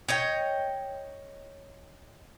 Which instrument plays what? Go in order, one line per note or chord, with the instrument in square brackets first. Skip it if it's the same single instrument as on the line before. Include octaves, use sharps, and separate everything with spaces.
[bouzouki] C#5 D#5 G5